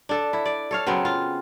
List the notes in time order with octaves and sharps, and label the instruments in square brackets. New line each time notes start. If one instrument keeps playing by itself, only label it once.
[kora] D4 A4
E4
D5
A4 C#5 F5
C#3 F#3 B3 C4
F4